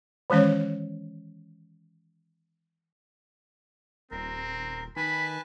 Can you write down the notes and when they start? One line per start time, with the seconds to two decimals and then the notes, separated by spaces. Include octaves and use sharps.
0.30 D#3 E3 G#3 C#4 C#5
4.11 D#1 C4 A#4
4.96 D#3 B4 G#5 A5 B5